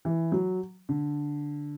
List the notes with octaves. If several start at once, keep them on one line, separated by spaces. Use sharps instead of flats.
E3
F#3
D3